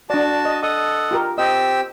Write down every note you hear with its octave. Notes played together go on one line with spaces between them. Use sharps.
D4 F#4 D5 A5
D#5
A4 D#5 F#5 D#6
F4 G4 A#4
C4 G4 D#5 E6